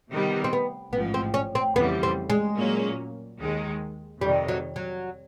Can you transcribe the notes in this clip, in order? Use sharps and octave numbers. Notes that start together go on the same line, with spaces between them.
C3 D#3 G3 B3
C4
B3
A1 G#2 F3 B3
C4
C#4
C4
F2 C#3 E3 G3 B3
C4
G#3
A#2 F#3 A#3 C#4
D#2 D#3 G#3
F2 C3 D#3 G3
F#3
F#3